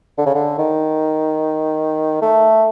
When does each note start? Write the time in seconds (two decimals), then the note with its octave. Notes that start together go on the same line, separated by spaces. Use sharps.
0.18 D3
0.26 C#3
0.35 D3
0.58 D#3
2.22 A3